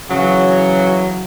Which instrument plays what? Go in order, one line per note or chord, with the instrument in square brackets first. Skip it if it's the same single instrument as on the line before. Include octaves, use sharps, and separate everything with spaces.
[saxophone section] C#3 E3 F#3